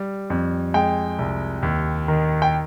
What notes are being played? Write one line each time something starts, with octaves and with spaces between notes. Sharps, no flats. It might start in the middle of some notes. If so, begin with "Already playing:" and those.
Already playing: G3
F2
G#3 G5
C2
D#2
D#3
G5